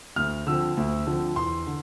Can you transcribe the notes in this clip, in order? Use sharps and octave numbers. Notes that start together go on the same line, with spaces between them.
D2 F6
D3 F3 C4 E6
D2
D3 F3 C4
E2 C6
D3